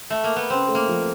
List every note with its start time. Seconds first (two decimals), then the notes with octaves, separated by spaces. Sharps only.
0.10 A3
0.24 A#3
0.36 B3
0.50 C#3 C4
0.68 A3
0.75 A#3
0.88 F3